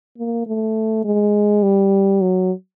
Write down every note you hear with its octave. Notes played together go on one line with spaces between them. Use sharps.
A#3
A3
G#3
G3
F#3